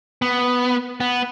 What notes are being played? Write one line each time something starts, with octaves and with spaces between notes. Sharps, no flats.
B3
B3